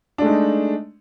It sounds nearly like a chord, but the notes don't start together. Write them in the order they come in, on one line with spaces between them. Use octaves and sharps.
D4 A3 G#3 D#4